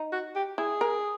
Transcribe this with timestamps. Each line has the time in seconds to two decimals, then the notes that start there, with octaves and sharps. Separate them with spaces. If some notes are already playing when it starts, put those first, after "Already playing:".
Already playing: D#4
0.12 F#4
0.36 G4
0.58 E4 G#4
0.81 A#4